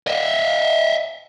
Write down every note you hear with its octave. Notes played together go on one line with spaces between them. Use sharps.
D#5 E5